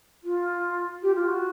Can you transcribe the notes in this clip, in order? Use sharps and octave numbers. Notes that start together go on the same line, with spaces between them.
F4
G4
F4
F#4